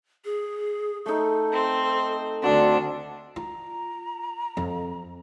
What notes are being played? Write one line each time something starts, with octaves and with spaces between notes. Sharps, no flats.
G#4
A3 D#4 A4
C4
D2 C4 D4 F#4 A4
F4 A#5
F2